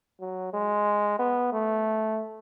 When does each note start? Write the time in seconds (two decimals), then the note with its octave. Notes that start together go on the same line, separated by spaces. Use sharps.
0.20 F#3
0.54 G#3
1.19 B3
1.52 A3